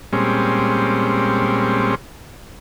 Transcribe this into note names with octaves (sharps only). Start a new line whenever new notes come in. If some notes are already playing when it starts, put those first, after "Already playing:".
A#2 G3 G#3 C4 C#4